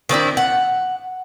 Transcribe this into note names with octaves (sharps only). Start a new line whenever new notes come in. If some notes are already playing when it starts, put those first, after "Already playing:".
D#3 C4 D4 E4
F#5